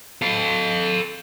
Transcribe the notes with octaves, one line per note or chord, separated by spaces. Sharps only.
A4 F5